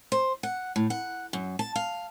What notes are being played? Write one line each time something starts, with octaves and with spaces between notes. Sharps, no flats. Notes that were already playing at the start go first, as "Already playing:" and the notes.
C5
F#5
A2
F#5
F#2
A5
F5